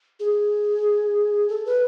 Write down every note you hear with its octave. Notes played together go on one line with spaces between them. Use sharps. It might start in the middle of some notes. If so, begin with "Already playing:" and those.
G#4
A4
B4